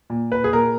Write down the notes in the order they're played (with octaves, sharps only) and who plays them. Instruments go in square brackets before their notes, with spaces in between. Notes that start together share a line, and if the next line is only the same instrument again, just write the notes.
[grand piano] A#2
B4
G#4
A#2 A#4